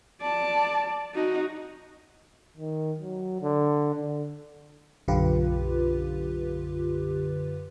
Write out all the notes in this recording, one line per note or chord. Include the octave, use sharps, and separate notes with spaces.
D5 A5
D#4 F#4
D#3
F#3
D3
D3
B1 F#2 D3 F4 G4 B4